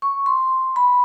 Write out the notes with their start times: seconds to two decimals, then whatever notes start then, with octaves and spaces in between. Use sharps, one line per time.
0.02 C#6
0.26 C6
0.76 B5